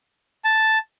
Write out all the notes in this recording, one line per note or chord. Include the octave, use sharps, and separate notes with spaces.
A5